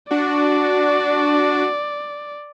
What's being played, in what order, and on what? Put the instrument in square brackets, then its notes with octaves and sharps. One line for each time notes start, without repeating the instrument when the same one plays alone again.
[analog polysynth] D4 F#4 [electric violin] D5